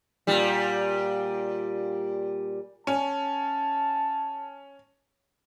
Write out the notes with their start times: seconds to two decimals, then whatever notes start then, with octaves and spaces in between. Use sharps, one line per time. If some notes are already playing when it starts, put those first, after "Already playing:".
0.27 A#2 G3
2.87 C#4 A5